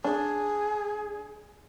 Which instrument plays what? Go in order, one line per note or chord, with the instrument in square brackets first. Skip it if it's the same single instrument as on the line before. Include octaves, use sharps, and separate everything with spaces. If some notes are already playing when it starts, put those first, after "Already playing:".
[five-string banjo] D4 [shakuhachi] G#4